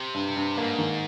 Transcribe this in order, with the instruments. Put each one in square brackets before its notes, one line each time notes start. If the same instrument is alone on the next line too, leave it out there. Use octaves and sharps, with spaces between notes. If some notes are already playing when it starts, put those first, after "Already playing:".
Already playing: [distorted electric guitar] C3
[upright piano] G2
G2
[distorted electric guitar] G#2 [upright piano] A#3
[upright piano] D#3